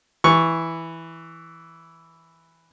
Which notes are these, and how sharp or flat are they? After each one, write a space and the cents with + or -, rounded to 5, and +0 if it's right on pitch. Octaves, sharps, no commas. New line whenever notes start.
E3 +0 C#6 +0